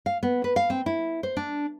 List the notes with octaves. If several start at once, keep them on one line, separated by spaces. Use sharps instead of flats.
F5
B3
B4
F5
C4
E4
C5
D4